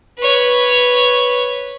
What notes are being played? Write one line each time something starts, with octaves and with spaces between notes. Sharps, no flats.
B4 C#5